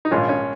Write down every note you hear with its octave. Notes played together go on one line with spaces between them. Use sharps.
D#4
A#1 G#2 D#3 C#4 F4
C#4